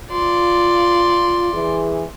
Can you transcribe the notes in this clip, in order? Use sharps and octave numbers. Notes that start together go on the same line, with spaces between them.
F4 D5 C6
E3 G#4